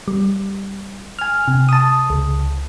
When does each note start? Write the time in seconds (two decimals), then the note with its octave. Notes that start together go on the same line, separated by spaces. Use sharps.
0.08 G3
1.19 G#5 F6
1.48 C3
1.69 A5 D#6
2.10 C#2